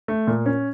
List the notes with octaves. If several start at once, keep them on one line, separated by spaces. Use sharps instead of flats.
A3
A#2
C#4